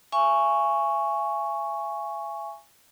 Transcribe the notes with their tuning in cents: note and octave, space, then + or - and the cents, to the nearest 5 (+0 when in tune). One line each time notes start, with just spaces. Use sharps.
E5 +40 G#5 +0 C#6 +0